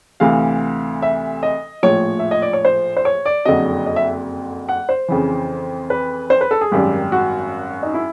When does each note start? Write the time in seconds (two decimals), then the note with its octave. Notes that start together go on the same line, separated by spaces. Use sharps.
0.20 D2 C3 E3 F5
1.02 E5
1.43 D#5
1.83 A#1 A2 F3 C#5
2.19 E5
2.31 D#5
2.42 D5
2.53 C#5
2.65 C5
2.97 C5
3.05 C#5
3.26 D5
3.45 F#1 F2 D3 F#3 D#5
3.86 D#5
3.96 E5
4.69 F#5
4.89 C5
5.08 F2 C#3 E3
5.90 B4
6.30 C5
6.41 B4
6.51 A4
6.61 G#4
6.71 G#1 F#2 D#3 G3 G4
7.12 F#4
7.83 D#4
7.94 E4